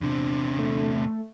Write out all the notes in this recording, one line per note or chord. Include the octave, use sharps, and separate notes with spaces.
E2 C3 D4
A3